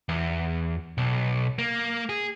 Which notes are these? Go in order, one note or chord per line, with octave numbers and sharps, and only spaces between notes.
E2
B1
A#3
G#4